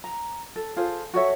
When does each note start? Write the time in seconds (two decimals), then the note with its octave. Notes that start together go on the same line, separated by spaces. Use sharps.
0.04 A#5
0.56 A4
0.77 F4 G#4 A4 C5
1.14 F#4 A4 C#5 E5